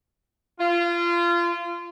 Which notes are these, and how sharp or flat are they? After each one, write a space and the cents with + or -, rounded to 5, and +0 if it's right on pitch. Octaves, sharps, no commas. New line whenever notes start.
F4 -25